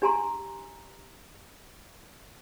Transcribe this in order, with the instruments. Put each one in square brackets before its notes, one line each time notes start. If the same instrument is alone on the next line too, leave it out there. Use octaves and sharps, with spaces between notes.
[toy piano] D4 G4 G#5 A#5 C6